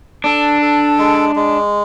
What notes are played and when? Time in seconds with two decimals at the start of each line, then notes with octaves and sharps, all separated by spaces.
0.24 D4 A4
0.62 A4
0.99 G#3
1.36 G#3